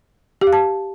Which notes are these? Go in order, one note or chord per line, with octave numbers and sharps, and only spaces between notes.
G4
F5
A5